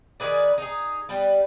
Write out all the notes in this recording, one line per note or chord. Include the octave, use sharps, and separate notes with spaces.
D#3 G#4 B4 D5
D#4 G#4
G3 B3